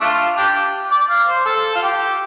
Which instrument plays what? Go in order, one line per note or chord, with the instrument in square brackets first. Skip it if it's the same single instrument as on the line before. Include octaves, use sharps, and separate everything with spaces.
[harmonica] A3 D4 F4
D4 G4
D5
F5
C5
A4
F4
G4